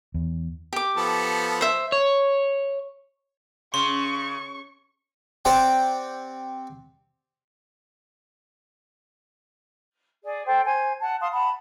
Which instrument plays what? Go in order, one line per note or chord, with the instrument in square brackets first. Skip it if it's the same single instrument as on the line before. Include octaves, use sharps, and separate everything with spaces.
[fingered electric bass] E2
[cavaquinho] G4 D6
[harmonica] F3 B3 A4
[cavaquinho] C5 E5
[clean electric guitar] C#5
[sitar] C#3 [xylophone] C6 [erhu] C#6
[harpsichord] C4 G4 C5 D5 F#5 G5
[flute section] G#4 D5
A4 C5 G5
C5 G#5
F#5 A5
F5 A5 C6 D#6
F#5 A5 B5